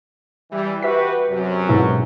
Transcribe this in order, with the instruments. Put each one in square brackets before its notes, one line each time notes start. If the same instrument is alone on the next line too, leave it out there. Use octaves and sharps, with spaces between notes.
[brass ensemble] E3 G3
[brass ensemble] F#4 G4 B4 [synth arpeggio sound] E5 B6
[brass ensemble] F#2 C3 F#3
[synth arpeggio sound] G#2 B2 E4